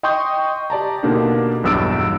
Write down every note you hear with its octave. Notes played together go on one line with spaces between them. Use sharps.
D#5 G5 C6 C#6 D#6 G6
G4 D5 A5 A#5
B2 D3 A#3 D4 D#4 G4
B1 E2 G2 E6 A6 D7